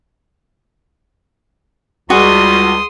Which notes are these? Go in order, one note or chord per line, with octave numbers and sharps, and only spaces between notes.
C#2 G3 F#4 G#4 F#5 G#5 C6 D#6